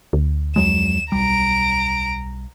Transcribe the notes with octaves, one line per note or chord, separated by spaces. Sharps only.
D2
F2 F#3 G#3 E7
B1 G3 A#5 D7